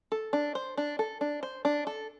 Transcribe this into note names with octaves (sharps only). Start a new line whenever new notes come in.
A4
D4
C5
D4
A4
D4
C5
D4
A4